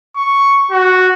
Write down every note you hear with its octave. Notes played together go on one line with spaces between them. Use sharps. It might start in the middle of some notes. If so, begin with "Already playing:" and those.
C#6
F#4